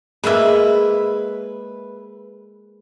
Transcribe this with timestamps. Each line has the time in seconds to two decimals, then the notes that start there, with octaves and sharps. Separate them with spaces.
0.24 G#3 A#3 E4 B4 E5